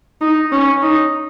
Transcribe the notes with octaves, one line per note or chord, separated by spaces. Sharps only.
D#4
C#4
D#4